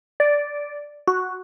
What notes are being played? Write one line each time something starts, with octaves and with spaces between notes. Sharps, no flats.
D5
F#4